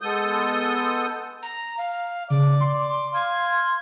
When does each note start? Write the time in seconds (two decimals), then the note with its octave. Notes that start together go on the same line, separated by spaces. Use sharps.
0.01 G#3 B3 A4 D#6 G6
1.43 A#5
1.78 F5
2.30 C#3 D5 D6
2.61 C6
2.80 D6
3.14 F5 G#6